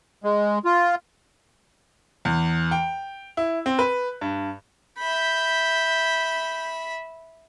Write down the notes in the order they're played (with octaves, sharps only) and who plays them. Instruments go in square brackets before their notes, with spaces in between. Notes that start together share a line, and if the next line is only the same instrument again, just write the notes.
[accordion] G#3
F4
[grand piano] E2
G5
E4
C4
B4
G2
[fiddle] E5 B5 [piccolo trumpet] G6